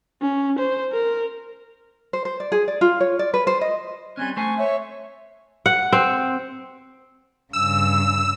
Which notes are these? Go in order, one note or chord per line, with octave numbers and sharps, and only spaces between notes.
C#4
C5
A#4
C5
C5
D5
G#4
D5
F4
C#5
D5
B4
C5
D#5
G3 C4 C#4 G#5 F#6 G#6
A3 C5 G#5 C#6
C#5 E5 C#6
F#5
C4
G2 C#3 E6